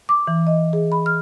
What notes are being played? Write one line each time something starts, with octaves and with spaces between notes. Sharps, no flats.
D6
E3
D#5
G#4
B5
F6